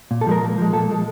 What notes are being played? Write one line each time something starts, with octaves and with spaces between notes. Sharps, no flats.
A#2
A4
F3 G#3 A#4
A#2
F3 G#3
A#2 A4
F3 G#3